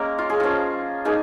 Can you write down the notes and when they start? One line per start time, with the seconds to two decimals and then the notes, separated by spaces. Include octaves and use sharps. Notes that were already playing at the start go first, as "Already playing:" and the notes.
Already playing: G#3 A#3 C#4 A#4 A#5
0.18 F4
0.30 G#4
0.40 F3 C#4 F4
1.05 A#3 D#4 G#4